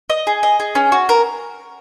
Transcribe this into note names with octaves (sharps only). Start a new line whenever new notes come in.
D#5
G#4
D#5
G#4
C#4
F#4
A#4